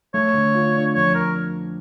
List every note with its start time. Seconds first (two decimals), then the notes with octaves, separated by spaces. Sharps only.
0.14 A3 C#5
0.34 D3
0.54 F4
0.75 D4
0.95 F2 C#5
1.14 A#4